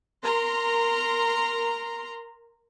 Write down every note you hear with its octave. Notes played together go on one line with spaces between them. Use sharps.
A#4 A#5 C6